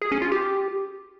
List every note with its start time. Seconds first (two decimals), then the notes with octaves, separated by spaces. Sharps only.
0.02 G#4
0.12 C#4
0.22 F4
0.32 G4